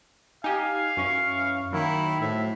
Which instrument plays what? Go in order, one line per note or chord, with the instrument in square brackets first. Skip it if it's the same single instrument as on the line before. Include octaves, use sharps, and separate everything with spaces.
[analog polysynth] D#4 G4 [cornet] F5 [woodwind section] G#5
[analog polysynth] F#2 C#4 [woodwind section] E3 C#6
[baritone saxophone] D#3 [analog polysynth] F#3 [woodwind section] A#3 [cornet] E4
[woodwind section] F2 [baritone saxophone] A2 [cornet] E5